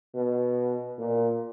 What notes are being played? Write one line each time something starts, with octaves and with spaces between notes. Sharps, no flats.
B2
A#2